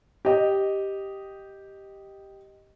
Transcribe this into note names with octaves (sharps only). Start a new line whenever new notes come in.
G4 D#5